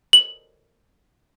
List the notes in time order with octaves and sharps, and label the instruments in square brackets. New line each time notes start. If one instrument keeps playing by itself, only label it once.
[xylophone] F#7